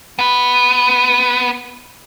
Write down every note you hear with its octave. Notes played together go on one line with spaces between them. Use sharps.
B3 B4